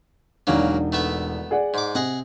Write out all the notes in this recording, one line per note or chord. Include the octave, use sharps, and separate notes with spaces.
E1 C#3 F#3 A#3 D4 D#4
A3 B3 E5
G#4 D5 F#5
G#2 D6
C3 G#4 D#5 F#5